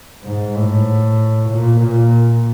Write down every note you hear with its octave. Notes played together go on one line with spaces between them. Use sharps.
G#2
A2
A#2
A#2